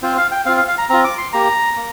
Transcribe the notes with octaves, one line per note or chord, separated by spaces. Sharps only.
C4 F4 C5
F5
G5
C4 F4 F5
F5
F5
A#5
C4 F4 A#5
D6
C6
A#3 G4 A#5
A#3